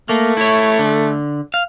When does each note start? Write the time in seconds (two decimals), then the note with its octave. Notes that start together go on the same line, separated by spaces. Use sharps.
0.09 A3 A#3
0.37 E4 C#5
0.79 D3
1.54 F5